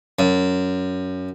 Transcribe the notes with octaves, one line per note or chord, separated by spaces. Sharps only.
F#2